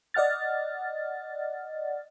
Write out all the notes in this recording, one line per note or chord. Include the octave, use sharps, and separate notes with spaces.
D5 D#5 F#5 F6 A6